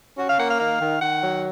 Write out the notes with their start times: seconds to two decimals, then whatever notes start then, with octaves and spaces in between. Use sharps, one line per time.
0.18 C#4 F#4
0.28 F5
0.39 A#3 F#5
0.50 F5
0.60 D#3 F5
0.80 D#3
1.01 D#3 F#5
1.22 F#3